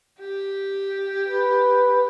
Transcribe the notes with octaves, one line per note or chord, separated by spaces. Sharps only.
G4
B4